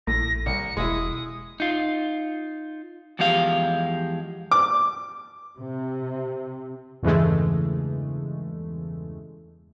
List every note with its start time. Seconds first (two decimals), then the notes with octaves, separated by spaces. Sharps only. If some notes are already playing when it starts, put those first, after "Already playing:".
0.07 A#1 A2 A#6
0.46 C2 C#7
0.77 E1 G#3 E4 D#6
1.60 D#4 F4
3.19 E2 F3 G#3 G4 F5
4.51 D6
5.57 C3
7.03 E2 G2 C#3 E3 G#3 A3